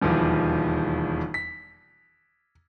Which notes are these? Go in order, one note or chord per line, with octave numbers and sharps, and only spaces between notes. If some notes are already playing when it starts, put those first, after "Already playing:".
E1 D#2 E3 F3 G3
B6